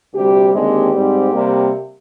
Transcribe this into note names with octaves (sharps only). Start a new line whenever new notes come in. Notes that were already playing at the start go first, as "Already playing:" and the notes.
D2 C3 G3 G4
D#2 D3 G#3 C4 G4
G#2 G3 C4
C3 G3 A#3